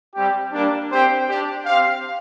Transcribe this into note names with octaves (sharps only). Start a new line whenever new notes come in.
G3 C4 G4
G3 A#3 D4
C4 G4 C5 G5
D4 G4 D5
C4 G4 C5 F5